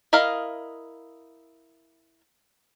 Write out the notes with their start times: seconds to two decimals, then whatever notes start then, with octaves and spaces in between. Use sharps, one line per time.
0.13 E4 A#4 D#5 F5